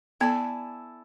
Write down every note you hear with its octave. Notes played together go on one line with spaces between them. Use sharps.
B3 E4 A4 D5 G#5